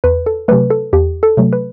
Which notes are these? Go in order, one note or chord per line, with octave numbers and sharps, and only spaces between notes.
E2 B4
A4
C3 F#3 A3 B4
A4
E2 G4
A4
C3 F#3 A3
B4